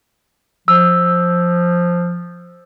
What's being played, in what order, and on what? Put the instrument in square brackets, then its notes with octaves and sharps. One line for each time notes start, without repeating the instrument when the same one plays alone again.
[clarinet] F3 [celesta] E6